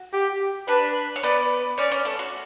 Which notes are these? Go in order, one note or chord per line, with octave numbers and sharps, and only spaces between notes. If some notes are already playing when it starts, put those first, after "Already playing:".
Already playing: F#4
G4
D4 B4 D5
C#5
B3 B4 D5
C#4 C#5 D5
C#4 C#5
A3 A4
F#4